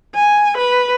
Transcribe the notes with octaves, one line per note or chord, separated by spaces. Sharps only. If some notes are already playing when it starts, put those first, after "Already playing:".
G#5
B4